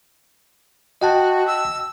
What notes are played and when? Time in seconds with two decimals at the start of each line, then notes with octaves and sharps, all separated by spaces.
1.01 F#4 D#5 G5 A5
1.47 E6